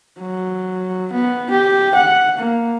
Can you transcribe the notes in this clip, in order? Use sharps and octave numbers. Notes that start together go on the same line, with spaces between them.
F#3
B3
G4
F#5
A#3